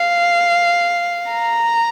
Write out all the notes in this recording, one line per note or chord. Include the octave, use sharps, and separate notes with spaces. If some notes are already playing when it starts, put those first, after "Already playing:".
Already playing: F5
A#5